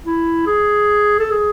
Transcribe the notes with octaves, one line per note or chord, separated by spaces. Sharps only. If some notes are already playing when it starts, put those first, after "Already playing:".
E4
G#4
A4
G#4